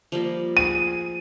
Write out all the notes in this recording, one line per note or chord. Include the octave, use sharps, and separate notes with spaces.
F3 G3 A#3
G#4 D#7